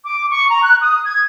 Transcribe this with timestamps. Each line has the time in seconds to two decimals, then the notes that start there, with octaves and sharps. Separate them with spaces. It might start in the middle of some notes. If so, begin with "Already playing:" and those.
0.05 D6
0.30 C#6
0.49 A#5
0.63 F#6
0.81 D#6
1.04 G#6